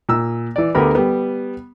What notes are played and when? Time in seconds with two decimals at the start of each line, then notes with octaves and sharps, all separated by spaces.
0.09 A#2 E6
0.56 E3 D5
0.75 D2 D3 B3 G4 A#4 B5
0.95 G3 B3